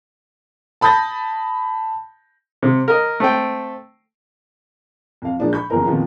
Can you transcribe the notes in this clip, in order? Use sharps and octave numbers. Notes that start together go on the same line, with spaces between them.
A5 B5 D#6 G6 A6 A#6
C3
A#4 D#5
A3 C4 G5
F2 F5
A#2 F3 G#3 A#3 D4 D#4
B5 C#6 G6
F#1 E2 F3 G#4 A#4 A#5
F2 A#2 D#3 F3 B3 F4